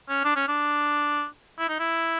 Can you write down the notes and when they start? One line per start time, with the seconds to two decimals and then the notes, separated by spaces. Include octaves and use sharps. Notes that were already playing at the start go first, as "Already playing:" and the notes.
0.09 C#4
0.24 D4
0.36 C#4
0.48 D4
1.58 E4
1.69 D#4
1.79 E4